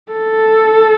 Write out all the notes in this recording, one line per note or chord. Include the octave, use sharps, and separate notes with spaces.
A4